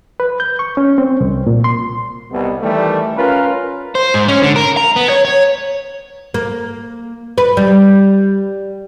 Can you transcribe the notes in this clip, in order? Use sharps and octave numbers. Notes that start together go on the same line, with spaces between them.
B4
G6
C#6
C#4
C4
C2
A#2
C6
C2 B2
D#3 E3 G3 A3
C#4 F4 A#4 B4
C5
G#2
C#4
D3
A#4
A#5
B3
C#5
C#5
A#3
B4
G3